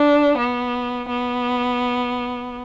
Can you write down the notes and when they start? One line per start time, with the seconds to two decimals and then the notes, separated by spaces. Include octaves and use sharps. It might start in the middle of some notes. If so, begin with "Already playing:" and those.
Already playing: D4
0.38 B3
1.08 B3